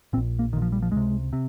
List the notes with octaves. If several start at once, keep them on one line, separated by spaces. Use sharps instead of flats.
A#1 A#2 C4
A#3
A#1 A#2 D#3
F3
G3
F3
C#2 C3 G#3
C3